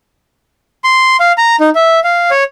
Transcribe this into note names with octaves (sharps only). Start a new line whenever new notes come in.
C6
F5
A#5
D#4
E5
F5
C#5